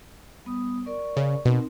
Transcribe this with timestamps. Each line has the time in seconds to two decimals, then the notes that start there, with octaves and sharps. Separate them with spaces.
0.45 G3 B3 D#6
0.86 A#4 D5 C#6
1.17 C#3
1.45 B2 C4 D#4 A#4